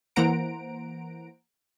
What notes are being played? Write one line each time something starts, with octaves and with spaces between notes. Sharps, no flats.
E3 A#3 C5 F#5 A#5 D7